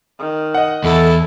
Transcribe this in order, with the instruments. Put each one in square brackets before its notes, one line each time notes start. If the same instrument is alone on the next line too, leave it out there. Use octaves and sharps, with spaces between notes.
[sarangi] D#3
[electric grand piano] D#5 F#5
[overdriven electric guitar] E2 [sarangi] E4 [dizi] A4